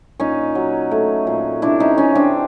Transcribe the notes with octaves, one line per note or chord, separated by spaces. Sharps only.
A#2 C#4 D#4
F#3
A3
A#2
C3 D4 E4
C#4 D#4
E3 C#4
C4 D4